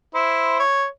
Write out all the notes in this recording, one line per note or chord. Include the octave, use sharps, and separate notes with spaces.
E4 C5
C#5